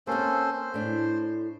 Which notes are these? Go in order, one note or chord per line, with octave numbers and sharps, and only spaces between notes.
A#3 C4 C#4 A4 C5
C5
A2 D4